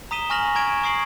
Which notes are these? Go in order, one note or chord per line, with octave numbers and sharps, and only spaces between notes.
A#5 D#6 B6 D#7 E7 G7
G#5 C#6 F6 A#6 F7 F#7
A#5 C#6 G#6 D7 E7
C#6 D#6 G#6 C7 D7 F#7